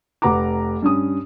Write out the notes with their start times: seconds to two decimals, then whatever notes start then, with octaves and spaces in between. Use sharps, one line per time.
0.22 F1 B4 F#5 A#5 D6
0.82 G2 C#4 D#6